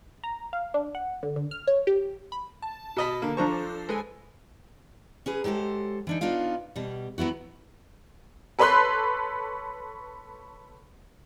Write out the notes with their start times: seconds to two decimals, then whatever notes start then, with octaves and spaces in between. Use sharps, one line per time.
0.24 A#5
0.53 F5
0.74 D4
0.95 F#5
1.23 D3
1.36 D3
1.51 F6
1.67 C#5
1.87 G4
2.32 B5
2.62 A5
2.97 B2 D#5 B5
3.22 D3 A#3
3.37 F3 D4 A4 C5 A#5 C#6
3.89 G#3 A4 B4 G#5
5.26 C#4 G#4 B4
5.44 F#3 G#3 G4 A4 C5
6.07 E3 D4 D#4
6.21 B3 D4 D#4 F4 F5
6.76 B2 G3
7.18 F#3 B3 E4 F#4
8.59 A4 B4 C#5 B5 C6 F#6